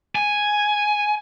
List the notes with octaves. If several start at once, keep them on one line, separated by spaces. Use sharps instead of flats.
G#5